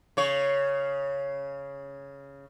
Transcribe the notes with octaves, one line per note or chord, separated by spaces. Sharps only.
C#3 C#5